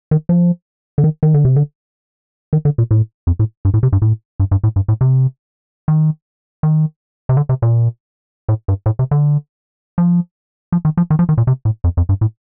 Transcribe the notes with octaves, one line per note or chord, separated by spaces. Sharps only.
D#3
F3
D3
D#3
D#3
D3
C3
D3
D#3
D3
A#2
A2
F2
A2
G2
A2
C3
G2
A2
G2
G2
A2
G2
A2
C3
D#3
D#3
C3
D3
C3
A#2
A2
G2
A2
C3
D3
F3
F3
D#3
F3
D#3
F3
D#3
A#2
C3
A2
F2
F2
G2
A2